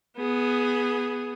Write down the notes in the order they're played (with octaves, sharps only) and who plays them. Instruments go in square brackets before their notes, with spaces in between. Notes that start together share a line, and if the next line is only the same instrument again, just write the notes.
[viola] B3 G#4